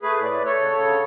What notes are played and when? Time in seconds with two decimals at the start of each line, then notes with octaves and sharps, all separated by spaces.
0.02 A3 G#4 B4
0.17 A2
0.24 B4 D5
0.30 A3
0.44 A3 A4 C#5
0.58 C#3
0.72 C#3
0.87 D3